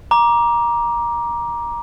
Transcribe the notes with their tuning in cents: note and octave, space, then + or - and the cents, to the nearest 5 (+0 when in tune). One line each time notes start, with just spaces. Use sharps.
A#5 +20 D6 +0